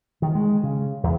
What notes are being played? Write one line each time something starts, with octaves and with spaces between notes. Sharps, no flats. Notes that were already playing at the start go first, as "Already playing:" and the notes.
D#3
G#3
C#3
E2